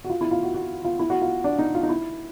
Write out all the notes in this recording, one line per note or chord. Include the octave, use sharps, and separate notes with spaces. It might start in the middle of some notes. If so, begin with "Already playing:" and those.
F#4
F4
E4
F4
F#4
F#4
F4
E4
F#4
F4
D4
D#4
F4
D#4
E4